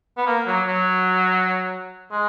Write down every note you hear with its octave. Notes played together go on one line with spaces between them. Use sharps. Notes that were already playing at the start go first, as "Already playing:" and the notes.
B3
A#3
F#3
F#3
G#3